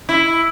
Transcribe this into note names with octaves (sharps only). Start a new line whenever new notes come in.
E4